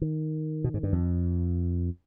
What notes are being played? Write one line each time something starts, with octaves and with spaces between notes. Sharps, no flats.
D#3
B2
G#2
G2
F2